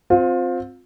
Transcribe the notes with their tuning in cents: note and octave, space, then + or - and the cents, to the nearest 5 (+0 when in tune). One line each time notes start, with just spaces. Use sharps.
C4 +0 F4 +25